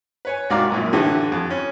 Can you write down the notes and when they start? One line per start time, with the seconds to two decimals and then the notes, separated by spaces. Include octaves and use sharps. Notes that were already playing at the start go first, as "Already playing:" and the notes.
0.25 B4 C#5 G#5
0.50 C2 G#2 F#4 D5 F5 A#5
0.70 A#1 F#2 A#2
0.92 A2 D3 E3 A3 G4 B4
1.32 F2
1.50 C#4